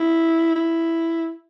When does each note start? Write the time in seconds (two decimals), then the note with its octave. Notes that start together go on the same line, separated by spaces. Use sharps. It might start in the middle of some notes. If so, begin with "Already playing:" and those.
Already playing: E4
0.55 E4